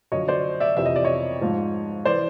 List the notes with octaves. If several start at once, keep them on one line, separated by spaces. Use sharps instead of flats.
F#2 D3 F3 C#5 D#5
C5 D5
D5 E5
F2 C3 E3 E5
D#5
D5
C#5 D#5
G#2 F3
E3 C5 D5